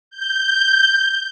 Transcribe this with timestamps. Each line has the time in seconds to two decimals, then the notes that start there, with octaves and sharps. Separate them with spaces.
0.10 G6